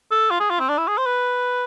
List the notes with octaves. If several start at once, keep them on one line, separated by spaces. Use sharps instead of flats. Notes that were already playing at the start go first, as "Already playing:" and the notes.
A4
F4
G#4
F4
C4
D4
E4
G#4
C5
B4